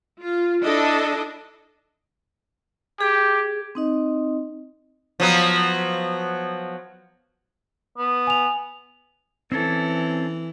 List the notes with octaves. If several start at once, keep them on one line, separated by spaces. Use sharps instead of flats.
F4
D4 E4 A4 D#5
G4 G#4
C4 D#4 D#5
F3 F#3 B3
B3
G#5 F7
E3 C4 C#4 A4